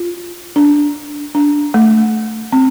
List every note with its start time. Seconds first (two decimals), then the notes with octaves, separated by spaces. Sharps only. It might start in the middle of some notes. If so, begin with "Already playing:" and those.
Already playing: F4
0.56 D4
1.35 D4
1.74 A3
2.53 C4